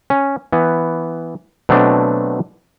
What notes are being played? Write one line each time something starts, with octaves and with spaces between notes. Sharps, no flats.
C#4
E3 B3
B2 F#3 A3 C4 D4